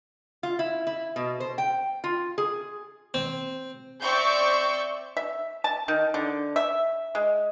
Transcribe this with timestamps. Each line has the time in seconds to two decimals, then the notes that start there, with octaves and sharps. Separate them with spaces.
0.43 F4
0.59 E4
0.87 E4
1.16 B2
1.40 C5
1.58 G5
2.04 F4
2.38 G#4
3.14 C4
4.02 C4 D5 E5 C#6 G6
5.17 E5
5.64 A5
5.88 D#3
6.14 D3
6.56 E5
7.15 G#3